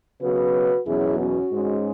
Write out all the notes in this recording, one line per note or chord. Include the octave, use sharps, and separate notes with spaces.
C#3 F#3 B3 F#4 B4
E2 B2 F#3 C#4 E4 G#4
C#4 F#4
G#2 G#3 C#4